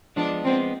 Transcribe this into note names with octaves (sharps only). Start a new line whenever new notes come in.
F3 G#3 B3 D4
F3 G#3 B3 C4